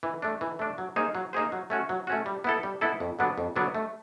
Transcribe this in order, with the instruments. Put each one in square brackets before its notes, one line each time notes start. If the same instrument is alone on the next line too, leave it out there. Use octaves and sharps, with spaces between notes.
[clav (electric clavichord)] E3
A3 D4
E3
A3 D4
F#3
A#3 D#4 G#4 C5
F#3
A#3 D#4 G#4 C5
F#3
A3 C#4 F#4
F#3
A3 C#4 F#4
G3
B3 E4 A4
G3
B3 E4 A4
F2
D3 F#3 B3 D4
F2
D3 F#3 B3 D4
A3